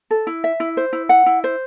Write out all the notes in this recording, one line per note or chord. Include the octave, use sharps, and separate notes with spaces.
A4
E4
E5
E4
C5
E4
F#5
E4
C5